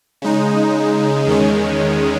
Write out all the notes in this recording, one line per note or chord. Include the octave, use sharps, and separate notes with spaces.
C#3 G#3 D#4
E2 D#3 G#3 C#4